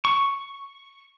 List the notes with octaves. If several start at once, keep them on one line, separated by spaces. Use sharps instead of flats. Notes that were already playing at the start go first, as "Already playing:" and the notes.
C#6